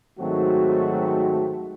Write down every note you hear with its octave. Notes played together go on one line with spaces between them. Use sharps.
G#2 D#3 F#3 A3 C4 F#4